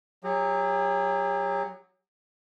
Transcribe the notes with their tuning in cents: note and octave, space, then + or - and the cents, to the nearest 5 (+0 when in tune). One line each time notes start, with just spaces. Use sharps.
F#3 +0 G4 +45